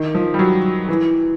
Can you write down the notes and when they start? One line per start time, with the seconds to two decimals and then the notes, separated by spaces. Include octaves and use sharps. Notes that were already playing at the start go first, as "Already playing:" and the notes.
Already playing: D#3
0.15 F3
0.34 G3
0.39 F#3
0.89 E3